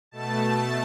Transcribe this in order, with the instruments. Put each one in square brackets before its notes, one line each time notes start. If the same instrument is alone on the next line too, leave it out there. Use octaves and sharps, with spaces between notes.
[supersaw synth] B2 A3 A5